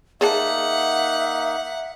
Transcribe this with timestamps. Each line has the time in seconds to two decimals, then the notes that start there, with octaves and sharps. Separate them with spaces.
0.21 A#3 D#4 G#4 D5 E5 F#5 A5